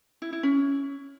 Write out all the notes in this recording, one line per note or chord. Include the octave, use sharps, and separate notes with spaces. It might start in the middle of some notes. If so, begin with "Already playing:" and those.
E4
E4
C#4